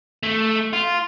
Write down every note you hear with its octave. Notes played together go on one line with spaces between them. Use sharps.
A3
F4